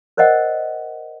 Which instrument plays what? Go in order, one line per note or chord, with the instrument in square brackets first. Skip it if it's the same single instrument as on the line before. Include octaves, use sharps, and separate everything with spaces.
[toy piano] A#4 C5 D5 D#5 F#5